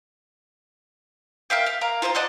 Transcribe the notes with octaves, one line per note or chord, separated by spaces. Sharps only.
A#4 E5 F5 G5
F5
A#3 F5 A#5
F4 C5 G#5 A#5
D5 D#5 F#5 A5